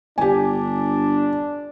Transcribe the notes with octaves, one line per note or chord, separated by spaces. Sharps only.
G1 D4 G4 G#5